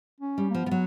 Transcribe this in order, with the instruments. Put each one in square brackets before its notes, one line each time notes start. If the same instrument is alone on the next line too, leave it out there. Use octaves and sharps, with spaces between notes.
[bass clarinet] C#4
[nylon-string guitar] G3
[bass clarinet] A#3
[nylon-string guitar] F3 [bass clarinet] B3
[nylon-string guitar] F3
F#3